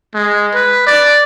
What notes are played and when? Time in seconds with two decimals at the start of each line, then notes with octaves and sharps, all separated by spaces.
0.14 G#3
0.54 B4
0.87 D5